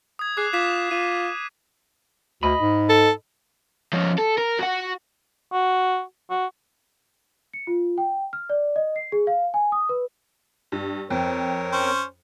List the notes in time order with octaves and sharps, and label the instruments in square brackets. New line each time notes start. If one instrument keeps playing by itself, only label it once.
[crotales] D#6 G#6
[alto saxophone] G#4 [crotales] D6 F#6 C7
[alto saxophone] F4 [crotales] D6 B6 E7
[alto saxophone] F4 [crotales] D#7
[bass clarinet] D2 [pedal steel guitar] D#5 B5
[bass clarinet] G#2
[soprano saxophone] A4
[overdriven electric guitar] F3 C#4
A4
A#4
F#4 F#5
[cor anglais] F#4
F#4
[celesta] C#7
F4
G5
F6
D5
D#5
C7
G#4
F5
G#5
D#6
B4
[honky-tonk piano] G2
[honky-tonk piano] F2 [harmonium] C4 A#4 C#5
[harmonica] C#4 C5